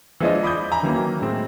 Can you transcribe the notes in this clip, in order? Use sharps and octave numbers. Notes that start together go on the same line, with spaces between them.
E3 F3 G#3 D4 F4 D#5
B5 D6 D#6 G6
G#5 A#5 B5
D#3 E3 F#3 A#3
A2 G#3 C4